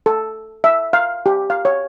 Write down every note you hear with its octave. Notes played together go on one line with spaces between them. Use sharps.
A4
E5
F5
G4
F5
C#5